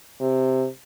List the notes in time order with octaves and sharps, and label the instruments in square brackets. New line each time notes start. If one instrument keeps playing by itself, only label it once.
[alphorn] C3